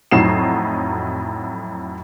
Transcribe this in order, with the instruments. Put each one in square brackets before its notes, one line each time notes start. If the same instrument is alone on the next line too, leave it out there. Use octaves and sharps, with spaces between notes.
[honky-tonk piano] F2 A2 F#3 D#4 C7 E7